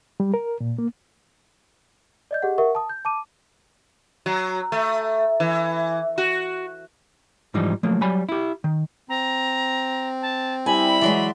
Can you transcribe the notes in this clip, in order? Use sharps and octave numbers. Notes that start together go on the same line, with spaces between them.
G3
A#4
A#2
A#3
D5 D#5 G6
G4 G#4 D#5 F#5
A#4 E5 F#5 C#6
A5 D#6
G6
A5 D6 D#7
F#3
A3
E3
F#4
G#2 E3 F3 G3 D#4
F3 F#3 A3 A#3
F#3 G3 G#5 B5
E4 G4
D#3
C4 A#5
A5
G3 E4 G#5 B5
E3 F#3 G#3 D5 E5 C6